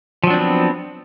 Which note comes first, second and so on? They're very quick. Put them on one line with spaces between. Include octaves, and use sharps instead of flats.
F3 F#3 D4 C4 B3